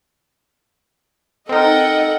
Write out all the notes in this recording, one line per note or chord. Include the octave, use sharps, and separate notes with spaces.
C4 D#4 A4 A#4 D#5 F#5 G5